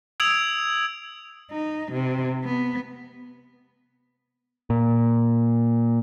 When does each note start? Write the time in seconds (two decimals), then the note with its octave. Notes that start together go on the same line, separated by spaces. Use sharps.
0.20 D#6 E6 G#6 D7 F7
1.51 D#4
1.92 C3
2.44 B3
4.70 A#2